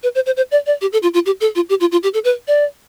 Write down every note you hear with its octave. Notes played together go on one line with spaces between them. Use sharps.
B4
C5
C5
C5
D5
D5
G4
A4
F4
F4
G4
A4
F4
G4
F4
F4
G4
A4
B4
D5